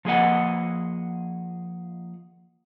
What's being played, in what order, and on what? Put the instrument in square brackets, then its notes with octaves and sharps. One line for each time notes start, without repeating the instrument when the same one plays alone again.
[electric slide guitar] F3 A#3 G#4 B4 D#5 F#5